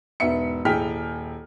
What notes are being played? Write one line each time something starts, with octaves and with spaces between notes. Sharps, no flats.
E1 G#2 B3 E5 C#7
D#1 E4 G#4 G5 F6 B6